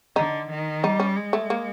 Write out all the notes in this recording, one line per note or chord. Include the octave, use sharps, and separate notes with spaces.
D3 D#4
D#3
G3 D#4
C#4
G#3
A3
A#3